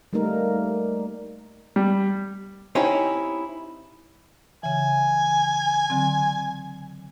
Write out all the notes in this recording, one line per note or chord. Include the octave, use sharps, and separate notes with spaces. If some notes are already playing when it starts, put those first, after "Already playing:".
G3 A3 A#3 D#4 A#4
G3
C4 C#4 D#4 E4 G4 C#5
C#3 E3 G#5
D3 F#3 C4